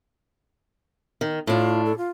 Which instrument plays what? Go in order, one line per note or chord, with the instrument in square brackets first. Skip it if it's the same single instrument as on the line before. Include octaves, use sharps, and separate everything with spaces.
[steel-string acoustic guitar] D#3
[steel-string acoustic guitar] A2 D4 [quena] F4
[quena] A4
F4